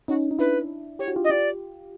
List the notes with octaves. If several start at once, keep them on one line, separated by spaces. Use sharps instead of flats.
C#4 D#4 F#4
D#4
D4 E4 B4
G4 C#5
F#4
F4 G4
D#5
F4 G4 D5